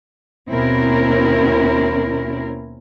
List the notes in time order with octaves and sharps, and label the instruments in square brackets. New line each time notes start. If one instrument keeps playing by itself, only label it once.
[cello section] D#2 B2 C4 C#4 E4 A#4